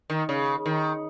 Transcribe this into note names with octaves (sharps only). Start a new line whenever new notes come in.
D#3
C#3
D#3